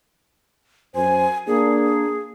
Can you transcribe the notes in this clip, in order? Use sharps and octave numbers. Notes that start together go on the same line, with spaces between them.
F#2 C5 G#5
A#3 D4 G#4